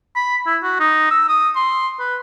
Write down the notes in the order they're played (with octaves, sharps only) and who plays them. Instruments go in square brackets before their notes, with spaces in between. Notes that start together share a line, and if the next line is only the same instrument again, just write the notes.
[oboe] B5
E4
F#4
D#4
E6
D#6
C6
B4